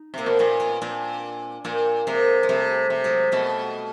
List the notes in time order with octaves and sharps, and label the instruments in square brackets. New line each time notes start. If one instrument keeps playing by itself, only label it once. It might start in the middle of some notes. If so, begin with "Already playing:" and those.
Already playing: [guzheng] D#4
[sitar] C3 [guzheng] A#3 C4
[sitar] B2
[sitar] A#2 [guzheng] B3 C#4
[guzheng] B3 C#4
[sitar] A#2 [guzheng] C4 D4
[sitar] A#2 [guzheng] A#3 C4
[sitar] C3 [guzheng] G#3 A#3
[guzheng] G#3
[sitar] C3 [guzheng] G3 A3
[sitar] C3
[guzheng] F#3 G#3
[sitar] B2 [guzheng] G3 A3